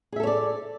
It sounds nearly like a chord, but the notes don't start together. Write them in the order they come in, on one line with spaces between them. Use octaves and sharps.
G#4 E5 A4 C#5 D5